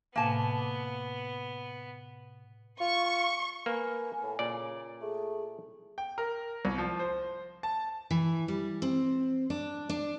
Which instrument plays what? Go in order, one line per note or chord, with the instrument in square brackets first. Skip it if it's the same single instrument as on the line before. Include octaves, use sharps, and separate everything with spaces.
[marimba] A2 C3 G#5 [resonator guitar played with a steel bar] A#3 A5 [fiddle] B3
[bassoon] F4 [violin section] C#6
[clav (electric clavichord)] A#3 [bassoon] B4 [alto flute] G#5
[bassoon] A2
[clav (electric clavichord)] A#2 D5 [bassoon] C#3
[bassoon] A3 [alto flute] G#4
[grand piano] G5
A#4
C2
F3
C5
A5
[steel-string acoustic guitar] E3
G3
C4
D4
D4